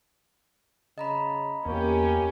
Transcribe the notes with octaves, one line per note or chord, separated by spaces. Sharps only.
C#3 D#5 A#5 B5
E2 A#3 C#4 G4